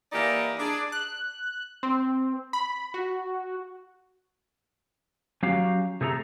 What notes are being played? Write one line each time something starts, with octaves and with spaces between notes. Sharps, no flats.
E3 A#3 D#4 E4 G4 D5
D4 G#4
F#6
C4
B5
F#4
F#3 C#4 F#4 G4 F5
C3 A3 G#4 A4 B4 A#5